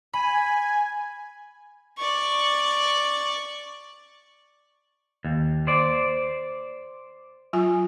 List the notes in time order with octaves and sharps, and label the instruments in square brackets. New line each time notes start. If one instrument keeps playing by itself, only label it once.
[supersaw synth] G#5 [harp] B5
[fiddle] D5 C#6
[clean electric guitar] D#2
C5 D5
[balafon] F#3 F4 G#5